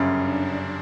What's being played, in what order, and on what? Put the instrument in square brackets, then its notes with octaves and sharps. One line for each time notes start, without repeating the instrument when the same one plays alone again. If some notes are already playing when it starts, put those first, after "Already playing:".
Already playing: [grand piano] G1 F#2 C#3 G3
[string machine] D4